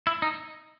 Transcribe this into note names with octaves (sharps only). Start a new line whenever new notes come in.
E4
D#4